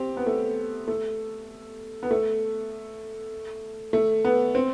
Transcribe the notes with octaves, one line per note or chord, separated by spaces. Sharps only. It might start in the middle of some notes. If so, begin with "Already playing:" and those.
Already playing: C4 G4
B3
A3
A3
B3
A3
A3
B3
C4